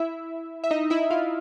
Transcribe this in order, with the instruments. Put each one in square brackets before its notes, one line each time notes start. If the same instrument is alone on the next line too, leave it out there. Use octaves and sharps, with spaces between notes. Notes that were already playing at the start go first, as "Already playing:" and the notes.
Already playing: [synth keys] E4 E5
E5
D#4 D#5
E4 E5
F4 F5